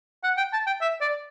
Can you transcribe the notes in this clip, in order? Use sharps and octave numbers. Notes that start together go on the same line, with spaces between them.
F#5
G5
A5
G5
E5
D5